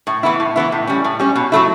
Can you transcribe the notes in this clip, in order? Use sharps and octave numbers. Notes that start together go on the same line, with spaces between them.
A2
E3 B3 E4
A2
E3 B3 E4
A2
G3 C#4
A2
G3 C#4
B2
F#3 A3 E4